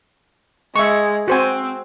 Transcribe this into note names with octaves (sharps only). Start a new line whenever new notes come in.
G#3 E5 C#6
C4 F#4 C5 G#5